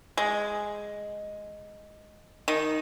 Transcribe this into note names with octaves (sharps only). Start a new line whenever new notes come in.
G#3
D#3